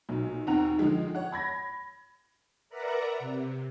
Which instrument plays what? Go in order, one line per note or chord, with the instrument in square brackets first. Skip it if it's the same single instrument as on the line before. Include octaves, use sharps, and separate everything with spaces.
[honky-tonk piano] B1 A#2 F#3
D#2 C4 F#5 A#5 F7
D3 D#3 F3 G#3 D#4
C#5 F#5
B5 G#6 A#6
[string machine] A#4 B4 D5 E5 F#5 A#5
C3